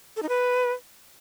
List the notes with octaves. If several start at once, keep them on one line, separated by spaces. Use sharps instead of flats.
A4
D#4
B4